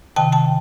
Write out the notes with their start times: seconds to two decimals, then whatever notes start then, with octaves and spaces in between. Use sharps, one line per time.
0.16 C3 D#3 G5 A5
0.32 G5 A5